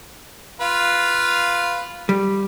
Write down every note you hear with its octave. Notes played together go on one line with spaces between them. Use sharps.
F4 B4 F5
G3